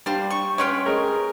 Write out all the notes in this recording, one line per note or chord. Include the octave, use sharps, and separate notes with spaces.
G3 D4 C5 F5
C#6
C#4 B4 C#5 G5 C6 F6
G#3 A#4